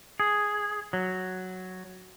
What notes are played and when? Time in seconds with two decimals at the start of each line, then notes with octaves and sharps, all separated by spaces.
0.20 G#4
0.93 F#3